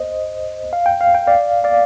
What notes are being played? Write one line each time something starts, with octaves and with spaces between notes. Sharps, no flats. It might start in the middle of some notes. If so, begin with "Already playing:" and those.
Already playing: C5 D#5
F5
G5
F5
G5
D5 F5
D5 F5